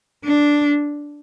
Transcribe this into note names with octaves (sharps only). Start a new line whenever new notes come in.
D4